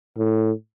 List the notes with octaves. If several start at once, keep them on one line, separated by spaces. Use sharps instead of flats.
A2